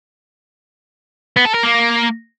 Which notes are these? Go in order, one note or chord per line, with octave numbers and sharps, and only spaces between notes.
B3
A4
A#4
A#3